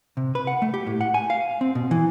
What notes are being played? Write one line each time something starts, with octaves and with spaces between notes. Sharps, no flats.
C3
B4
F#5
A3
G4
A2
F#5
G#5
F5
C4
B2
E3